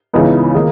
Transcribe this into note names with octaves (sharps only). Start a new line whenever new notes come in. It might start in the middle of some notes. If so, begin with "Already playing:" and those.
C#2 C#3 E3 B3 D#4
D#3 A#3 D#4 G#4